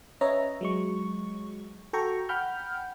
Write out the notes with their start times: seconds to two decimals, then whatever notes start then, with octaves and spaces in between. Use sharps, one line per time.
0.21 C#4 B4 C#5 D#5 E5 A#5
0.61 F#3 G#3 C#6
1.93 F#4 A4 G5 A#5 C#6
2.29 F#5 G5 B5 F6 G6